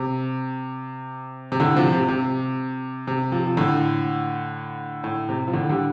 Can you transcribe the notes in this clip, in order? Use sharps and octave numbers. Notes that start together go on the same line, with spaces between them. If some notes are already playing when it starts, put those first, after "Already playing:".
Already playing: C3
C3
A2 D3
C3 F3
C3
C3
C3
C3 F3
F3
A2 D3
A2
C3
F3
A2 D3
D3 G3